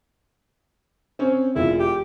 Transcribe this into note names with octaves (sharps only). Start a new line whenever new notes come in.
C4 C#4
E1 E4 F4
G4